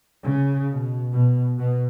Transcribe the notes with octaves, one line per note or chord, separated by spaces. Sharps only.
C#3
B2
B2
B2